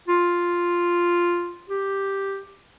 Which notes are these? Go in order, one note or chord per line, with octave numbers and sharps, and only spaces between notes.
F4
G4